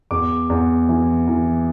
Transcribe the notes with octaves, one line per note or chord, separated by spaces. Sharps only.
E2 D6
E2
E3
E3